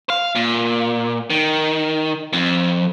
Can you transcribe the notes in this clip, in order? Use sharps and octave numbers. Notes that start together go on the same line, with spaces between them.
F5
A#2
D#3
F2